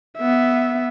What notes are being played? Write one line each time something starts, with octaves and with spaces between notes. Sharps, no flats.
B3 E5